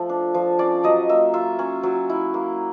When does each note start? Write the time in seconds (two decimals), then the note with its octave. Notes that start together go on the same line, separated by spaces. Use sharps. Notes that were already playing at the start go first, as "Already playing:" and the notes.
Already playing: F3 A3
0.09 D4
0.34 F3
0.59 C#4 D5
0.84 F#3 D#5
1.09 A#3 E5
1.34 F4 E5
1.59 C#4
1.83 F#3
2.09 E4
2.34 A#3